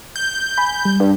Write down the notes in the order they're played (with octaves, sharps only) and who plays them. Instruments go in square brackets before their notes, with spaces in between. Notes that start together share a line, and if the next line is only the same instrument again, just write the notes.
[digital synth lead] G6
[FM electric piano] G#5 B5
G3
[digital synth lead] G2